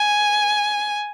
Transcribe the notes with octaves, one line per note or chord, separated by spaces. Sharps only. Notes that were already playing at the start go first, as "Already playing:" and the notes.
Already playing: G#5